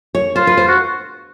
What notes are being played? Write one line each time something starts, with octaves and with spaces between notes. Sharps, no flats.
C#5
F4 C5
B4
C5
F#4